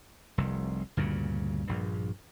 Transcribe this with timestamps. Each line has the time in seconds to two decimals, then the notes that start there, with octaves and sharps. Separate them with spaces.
0.38 F1 C2
0.97 D2 G2 A#2 C#3
1.67 A#1 G2